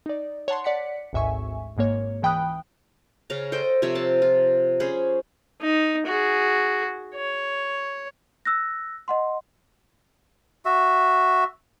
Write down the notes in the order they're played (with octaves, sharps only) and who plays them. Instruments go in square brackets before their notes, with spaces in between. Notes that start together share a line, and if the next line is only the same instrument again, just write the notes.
[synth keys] D#4 D5
C#5 F#5 A5 C6
D5 F#5 B6 C#7
G#1 D2 G#2 E5 G#5 C#6
G#1 G#2 A#3 C#5
C#2 E3 G5 B5 D#6 F#6
[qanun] C#3 C#4 F5 A#5
A4 C5 D#5 G5
C3 F3 C#5 E5
C5 F5 A5
F4
C#4 G#4 C5 B5
[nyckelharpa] D#4
F#4 G#4
C#5
[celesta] E6 F#6 A#6
D#5 F#5 C6
[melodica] F#4 E5